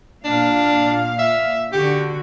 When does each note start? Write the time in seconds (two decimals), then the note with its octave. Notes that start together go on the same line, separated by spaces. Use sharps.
0.25 A#2 D4 F5
1.19 E5
1.73 D3 F#4 G4